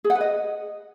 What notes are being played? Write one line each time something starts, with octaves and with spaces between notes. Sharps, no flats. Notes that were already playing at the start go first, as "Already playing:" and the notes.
G#4
F#5
B4
D#5